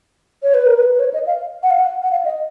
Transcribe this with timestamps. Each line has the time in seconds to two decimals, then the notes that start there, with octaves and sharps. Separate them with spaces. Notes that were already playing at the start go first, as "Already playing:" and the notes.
0.43 C#5
0.54 B4
0.66 A#4
0.76 B4
0.95 B4
0.99 C#5
1.14 D#5
1.27 F5
1.63 F#5
1.70 F5
1.79 F#5
2.03 F#5
2.11 F5
2.25 D#5